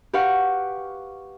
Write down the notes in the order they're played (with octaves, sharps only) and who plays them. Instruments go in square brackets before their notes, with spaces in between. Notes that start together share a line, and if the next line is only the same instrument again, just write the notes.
[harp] G4 B4 F5 F#5 C#6